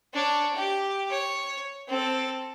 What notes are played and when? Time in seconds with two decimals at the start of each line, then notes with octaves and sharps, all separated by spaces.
0.14 D4 C#5
0.56 G4
1.10 C#5
1.87 C4 A4